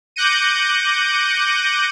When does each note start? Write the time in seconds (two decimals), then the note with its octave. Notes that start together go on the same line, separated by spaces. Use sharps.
0.16 D6 F#6 G6 A#6 C#7 D#7